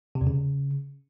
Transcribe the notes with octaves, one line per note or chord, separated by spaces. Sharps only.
C3
E2
C#3